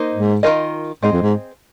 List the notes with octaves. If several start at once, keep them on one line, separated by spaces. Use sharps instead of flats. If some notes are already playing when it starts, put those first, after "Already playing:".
Already playing: A#3 D#4 C5 D#5
G#2
D#3 C4 F4 A#4 D#5
G#2 C4 G#4 C5 D#5
F2
G#2